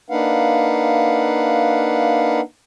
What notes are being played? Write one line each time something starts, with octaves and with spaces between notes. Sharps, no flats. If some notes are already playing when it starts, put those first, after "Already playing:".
A#3 D4 D#4 B4 F5 F#5